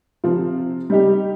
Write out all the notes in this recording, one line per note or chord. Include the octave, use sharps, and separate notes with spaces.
C3 F3 C4 F4
G3 D#4 G4